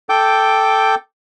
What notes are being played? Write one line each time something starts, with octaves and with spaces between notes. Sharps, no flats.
A4 G5 D6 G6